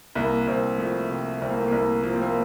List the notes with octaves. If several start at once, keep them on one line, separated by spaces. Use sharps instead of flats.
C2 A#3
C2 C4
F3 A3
C3
C2 C4
A#3
A3
C2 A#3
F3 A#3
C4
A#3